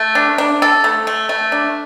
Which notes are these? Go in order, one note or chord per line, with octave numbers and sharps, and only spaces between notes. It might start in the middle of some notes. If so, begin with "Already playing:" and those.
Already playing: A3
D4
D4
A4
A3
A3
A3
D4